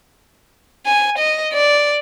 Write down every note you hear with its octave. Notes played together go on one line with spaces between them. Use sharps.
G#5
D#5
D5